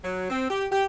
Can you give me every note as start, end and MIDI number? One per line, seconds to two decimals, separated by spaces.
0.04 0.26 54
0.30 0.47 60
0.50 0.66 67
0.72 0.85 67